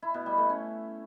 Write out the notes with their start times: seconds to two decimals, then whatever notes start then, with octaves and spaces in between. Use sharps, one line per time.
0.02 E4
0.14 B2
0.26 G3
0.38 A3
0.49 C#4